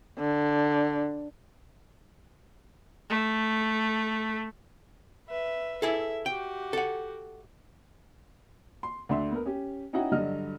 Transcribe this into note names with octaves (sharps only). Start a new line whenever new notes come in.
D3
A3
B4 E5
E4 G#4 A4 E5
F#4 G4 G5
A4 F#5
C6
D2 A3 D4 E5 C6
B3 A#4
C#4 G4
C#4 D#4 E4 F#4 F#5 G5
G2 D3 F#3 F#4 D#5 F6